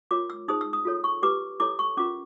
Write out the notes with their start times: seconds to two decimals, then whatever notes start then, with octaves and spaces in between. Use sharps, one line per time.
0.11 F4 A#4 C#5 D6
0.30 E6
0.48 D#4 G#4 C5 D#6
0.61 E6
0.73 D#6
0.85 F4 A4 C#5
1.04 C#6
1.23 E4 G4 B4 D6
1.60 E4 A4 C#5 D6
1.79 C#6
1.97 C#4 F4 A#4 D6